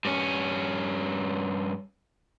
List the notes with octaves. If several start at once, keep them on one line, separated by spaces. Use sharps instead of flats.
G2 C#4